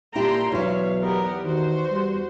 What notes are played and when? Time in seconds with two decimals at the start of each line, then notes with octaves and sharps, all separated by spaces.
0.15 A#2 D4 E4 G4 G5 A#5 C6
0.52 B1 E2 E4 C#5 F5
1.02 B3 G4 A#4
1.44 D#3 F#4 C5
1.91 G3